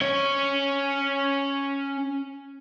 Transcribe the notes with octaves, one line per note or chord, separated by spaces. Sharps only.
C#4 C#5